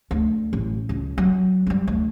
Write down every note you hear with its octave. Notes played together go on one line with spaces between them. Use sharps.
D2
A1
C#2
F#3
F3 G3
D2